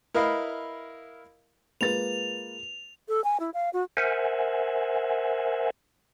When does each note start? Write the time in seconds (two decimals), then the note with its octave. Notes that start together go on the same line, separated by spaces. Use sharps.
0.14 E4 A#4 B4 D#5 F5
1.81 G#3 A#3 F4 B4 A6 F7
3.08 A4
3.24 G#5
3.40 E4
3.54 F5
3.73 F#4
3.97 A#4 C5 E5 F#5 G#5